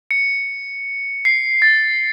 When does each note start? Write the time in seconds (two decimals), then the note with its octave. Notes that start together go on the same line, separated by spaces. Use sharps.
0.11 C#7
1.25 C7
1.62 A6